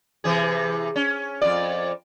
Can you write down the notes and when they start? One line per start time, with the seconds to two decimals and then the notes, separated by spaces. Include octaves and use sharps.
0.24 C3 E3 G#4
0.96 C#4
1.41 F2 F4 D5